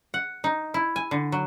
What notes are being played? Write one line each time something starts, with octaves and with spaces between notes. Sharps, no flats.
F#5
D#4
E4
G#5
D3
F#3